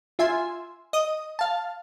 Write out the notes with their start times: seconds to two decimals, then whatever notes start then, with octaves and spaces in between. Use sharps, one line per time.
0.19 F4 E5 G#5 C6
0.93 D#5 D#6
1.39 F5 A5